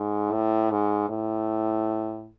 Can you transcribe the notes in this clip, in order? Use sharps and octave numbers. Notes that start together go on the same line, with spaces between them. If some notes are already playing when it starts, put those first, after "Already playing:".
Already playing: G#2
A2
G#2
A2